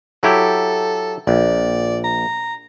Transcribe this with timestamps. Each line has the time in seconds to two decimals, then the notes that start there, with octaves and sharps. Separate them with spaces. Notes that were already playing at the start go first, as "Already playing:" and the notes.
0.23 F#3 E4 G4 A4
1.27 A#1 D5
2.04 A#5